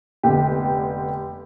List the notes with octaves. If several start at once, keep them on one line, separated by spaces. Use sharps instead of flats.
F1 D3 B3 G4